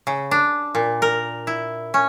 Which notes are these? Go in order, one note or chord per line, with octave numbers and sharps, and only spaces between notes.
C#3
D4
A#2
A#4
E4
C#4